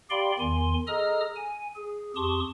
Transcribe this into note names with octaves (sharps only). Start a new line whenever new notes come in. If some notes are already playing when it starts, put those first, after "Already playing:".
G4 D5 F5 G5 B5 C6
E2 D#3 G#5 C6
G#4 A4 D#5 A#5 D#6 F6
G#5
G#4
F2 G4 A5 C6 C#6 D#6